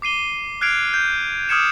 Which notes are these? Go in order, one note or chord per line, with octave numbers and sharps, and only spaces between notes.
D6 C7 D#7 G7
F6 F#6 G#6 C7 D7 F7
G6
D6 D#6 F6 G#6 C#7 E7